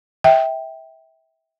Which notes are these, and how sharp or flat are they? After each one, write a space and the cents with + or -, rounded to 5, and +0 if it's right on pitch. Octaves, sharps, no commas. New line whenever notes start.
E5 -20 G5 +0